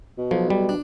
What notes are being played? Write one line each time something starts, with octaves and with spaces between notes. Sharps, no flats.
B2
B1 F3
G3
D4